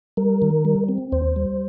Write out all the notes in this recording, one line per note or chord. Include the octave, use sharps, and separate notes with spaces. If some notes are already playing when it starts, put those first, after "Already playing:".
G3 A#4
D#3
G3
C4
D#2 C5
G3